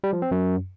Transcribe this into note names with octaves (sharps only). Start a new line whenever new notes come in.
G3
F3
C4
F#2